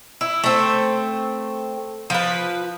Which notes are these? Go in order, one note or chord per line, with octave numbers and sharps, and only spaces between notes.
E4
A3 C4
F3 B4